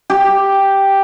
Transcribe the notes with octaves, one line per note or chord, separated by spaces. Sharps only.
G4